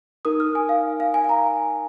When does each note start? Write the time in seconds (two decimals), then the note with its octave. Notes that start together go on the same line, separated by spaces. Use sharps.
0.25 D#4 A#4 D#6
0.40 F6
0.55 G#5
0.69 F5
1.00 F5
1.14 G#5
1.24 G#5
1.29 A#5